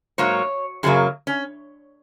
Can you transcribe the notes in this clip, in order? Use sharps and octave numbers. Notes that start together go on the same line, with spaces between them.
G#2 F#3 A#3 C#5
F#2 C#3 F#3 A#3 G#4
C#4